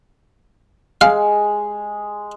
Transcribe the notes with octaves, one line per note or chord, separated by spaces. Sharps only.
G#3 F5